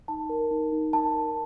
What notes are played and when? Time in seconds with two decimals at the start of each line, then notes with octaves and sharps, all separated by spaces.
0.08 D#4 A5
0.29 A#4
0.51 D#4
0.72 D#4
0.93 A#4 A5
1.14 A#4